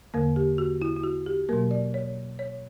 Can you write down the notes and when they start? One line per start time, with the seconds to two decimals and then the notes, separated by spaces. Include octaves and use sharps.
0.14 E2 D3 A#3 A#4
0.36 G4
0.58 F#4
0.82 E4
0.97 E4
1.03 F#4
1.26 G4
1.49 B2 F#3 A#3 A#4
1.71 D5
1.94 C#5
2.39 C#5